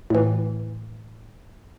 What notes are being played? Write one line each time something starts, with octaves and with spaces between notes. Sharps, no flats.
A2 E3